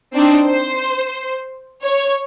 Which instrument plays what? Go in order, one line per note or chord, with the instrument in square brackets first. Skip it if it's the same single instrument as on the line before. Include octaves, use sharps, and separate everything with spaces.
[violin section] C4 D4 D#4
C5
C#5